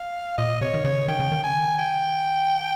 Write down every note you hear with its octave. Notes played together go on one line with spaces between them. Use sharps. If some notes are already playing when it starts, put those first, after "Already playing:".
Already playing: F5
A#2 D#5
C3 C#5
D#3
C#3 C#5
D#3 G5
C#3
D#3
G#5
G5